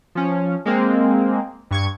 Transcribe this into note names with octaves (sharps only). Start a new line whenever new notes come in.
F3 C#4
G#3 A#3 C4
G2 C#6 G#6